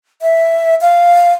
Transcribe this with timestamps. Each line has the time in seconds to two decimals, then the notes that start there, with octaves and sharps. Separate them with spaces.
0.22 E5
0.81 F5